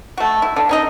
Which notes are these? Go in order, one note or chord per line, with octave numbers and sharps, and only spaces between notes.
A3 F#4
E4
D3
C#4 D#4 D#5